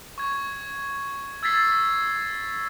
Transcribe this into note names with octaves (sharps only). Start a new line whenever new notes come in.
C#6 G#6
E6 G#6 A6 B6 C7